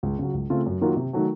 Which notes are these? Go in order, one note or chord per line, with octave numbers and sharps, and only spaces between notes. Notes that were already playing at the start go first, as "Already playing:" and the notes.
C#2
C#3 F#3
C#2
C#3 A3 C4 F4
F#2
D#3 F#3 A#3 F4
C3
D#3 F#3 A3